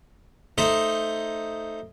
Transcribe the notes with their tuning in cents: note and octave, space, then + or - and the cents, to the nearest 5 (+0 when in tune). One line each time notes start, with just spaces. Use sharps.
A3 +0 D#4 +0 C5 +0